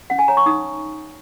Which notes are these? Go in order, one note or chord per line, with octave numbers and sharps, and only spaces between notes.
C#4 F#5
G#5
C#5 A#5
C#6
D#4 D#6